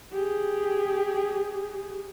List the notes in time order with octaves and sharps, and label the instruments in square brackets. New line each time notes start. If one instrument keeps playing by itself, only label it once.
[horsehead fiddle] G4 G#4